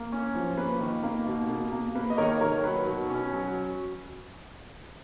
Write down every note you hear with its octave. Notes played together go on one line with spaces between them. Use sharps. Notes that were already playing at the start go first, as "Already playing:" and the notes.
Already playing: A#3
C#4
F3
A#3 B4
D#3
A#3
B2
A#3
A#3
A#3 B4
D#5
D#3 A#4 C#5
D#3 A#4 C#5
F#3 B4
B2
C#4
F#3